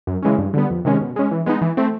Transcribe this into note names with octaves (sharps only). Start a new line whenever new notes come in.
F#2
C#3 E3 G#3 C#4
G2
D3 G3 B3
F2
C3 D#3 G#3 C#4
B2
G#3 C#4
E3
G#3 B3 D#4
E3
A3 C4